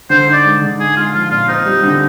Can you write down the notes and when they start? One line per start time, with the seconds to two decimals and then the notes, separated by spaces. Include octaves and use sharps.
0.10 D3 C5
0.28 D#4
0.33 D5
0.45 G#3
0.62 D3
0.79 D#4 G#4
0.97 G#3 F4
1.14 F3 F4
1.31 A#2 F4
1.48 C4 D#4
1.66 G3
1.83 D3